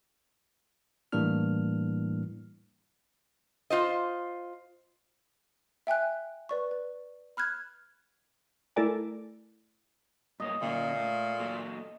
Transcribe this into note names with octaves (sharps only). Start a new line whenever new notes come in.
A2 E3 G3 A#3 D4 F6
F4 C5 D#5
E5 G5 G#5 F#6
B4 D5 C#6
B4
B5 F6 F#6 G#6
A3 E4 A4 A#4 D5 G#5
G2 A#3 C#5 D#5
A#2 D3 A#3 C#4
A3
F#3 A#3 A4